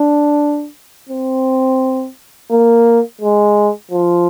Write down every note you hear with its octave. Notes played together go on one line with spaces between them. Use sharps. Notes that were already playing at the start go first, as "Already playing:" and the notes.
Already playing: D4
C4
A#3
G#3
F3